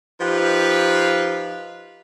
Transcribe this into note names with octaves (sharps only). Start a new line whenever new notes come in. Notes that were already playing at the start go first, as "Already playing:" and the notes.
F3 D#4 G4 B4 F5